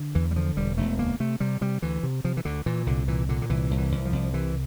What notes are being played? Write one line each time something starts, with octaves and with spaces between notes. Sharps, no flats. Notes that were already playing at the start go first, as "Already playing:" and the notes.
Already playing: D3
E2 E3
G3
D3 F3
E1 G3
E1 A3
D2 A#3
C3 A3
C3 G3
C3 G3
D2 E3
C3
C3 F3
E3
D2 D3
A#2 E3
C2 D3
A#2 E3
A#2 D3
D3
C2 E3
C2
E3
C2
F3
C2
C3 E3